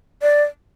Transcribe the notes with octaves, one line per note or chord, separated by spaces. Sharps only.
D5